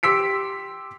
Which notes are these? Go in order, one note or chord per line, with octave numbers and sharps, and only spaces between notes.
G4 C6 E6 B6 D7